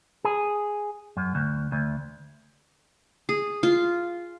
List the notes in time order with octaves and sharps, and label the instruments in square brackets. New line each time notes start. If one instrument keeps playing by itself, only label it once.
[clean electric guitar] G#4
F#2
D2
D2
[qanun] G#4
F4